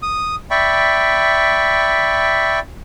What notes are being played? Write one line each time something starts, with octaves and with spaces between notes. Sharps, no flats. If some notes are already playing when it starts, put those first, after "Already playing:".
D#6
D5 E5 G5 B5 C#6